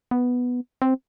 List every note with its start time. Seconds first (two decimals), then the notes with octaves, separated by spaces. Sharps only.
0.11 B3
0.82 C4